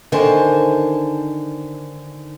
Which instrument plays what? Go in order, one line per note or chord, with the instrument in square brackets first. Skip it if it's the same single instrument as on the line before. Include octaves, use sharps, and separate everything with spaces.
[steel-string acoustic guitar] D3 D#3 A#4 C5 G#5 A5